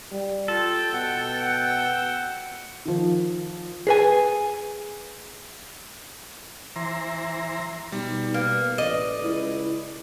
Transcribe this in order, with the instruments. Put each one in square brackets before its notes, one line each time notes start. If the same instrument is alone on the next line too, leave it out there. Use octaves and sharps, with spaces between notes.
[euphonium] G3
[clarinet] F4 [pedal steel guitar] A4 [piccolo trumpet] G5
[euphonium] B2 [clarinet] F#5
[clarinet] F#5
[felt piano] D#3 F3
[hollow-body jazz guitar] G#4 B4 G#5
[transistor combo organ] E3 C5 A#5
[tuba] B2 [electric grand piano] G3 [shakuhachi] D#4
[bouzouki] A#3 [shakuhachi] B4
[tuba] A1 [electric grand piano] D5 [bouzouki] D#5
[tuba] C#2 [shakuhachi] E4